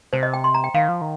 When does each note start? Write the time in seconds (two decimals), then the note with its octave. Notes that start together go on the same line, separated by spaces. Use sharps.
0.13 C3 C5
0.23 D#5
0.34 G5
0.44 C6
0.54 A#5
0.64 G5
0.74 D#3 F5
0.89 F3
1.01 D#3